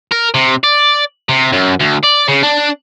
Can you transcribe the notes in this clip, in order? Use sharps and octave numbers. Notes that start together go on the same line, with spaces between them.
A#4
C3
D5
C3
F#2
D2
D5
C#3
D4